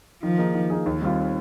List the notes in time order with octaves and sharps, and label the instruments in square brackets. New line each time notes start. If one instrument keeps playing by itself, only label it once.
[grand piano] D#3 [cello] F3
[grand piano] A#3 D#4 G#4
D#3
A#3 D#4 G#4
D#2
D#3 G3 C4 F4